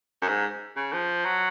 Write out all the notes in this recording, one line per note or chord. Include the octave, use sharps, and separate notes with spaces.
F#2
G#2
C#3
F3
F#3